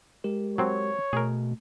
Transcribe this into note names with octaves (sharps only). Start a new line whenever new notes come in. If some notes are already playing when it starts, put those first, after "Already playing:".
G#3 G4 A#4
F#3 C4 C#5
B2 A3 G#4 A#4